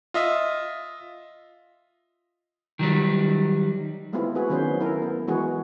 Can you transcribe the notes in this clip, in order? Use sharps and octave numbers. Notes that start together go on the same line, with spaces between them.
F4 D#5 E5
D#3 F#3 G3
G#3 A3 B3 C4 E4 F4
F#4 G#4 B4
D#3 F#3 B3 C#4 G#4 C5
E4 A4 A#4
B3
E3 G#3 B3 E4 F#4 G#4